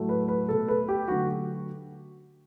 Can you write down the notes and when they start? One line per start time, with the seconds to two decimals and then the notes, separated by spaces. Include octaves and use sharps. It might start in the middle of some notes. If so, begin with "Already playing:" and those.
Already playing: A2 F#3 A3
0.09 B4
0.28 B4
0.49 B2 A3 A4
0.68 B4
0.88 G4
1.08 D3 F#3 A3 F#4